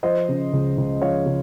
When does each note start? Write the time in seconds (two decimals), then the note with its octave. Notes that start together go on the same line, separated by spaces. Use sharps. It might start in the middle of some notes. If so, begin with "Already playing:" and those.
0.03 F3 C5 D#5
0.29 C#3
0.53 C#2
0.78 C#2
1.01 F3 C#5 F5
1.26 C#3